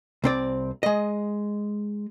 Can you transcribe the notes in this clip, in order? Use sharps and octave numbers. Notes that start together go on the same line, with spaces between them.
C2 C4 D5
G#3 D#5